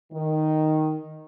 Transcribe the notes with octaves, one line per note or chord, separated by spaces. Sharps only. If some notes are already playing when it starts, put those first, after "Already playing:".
D#3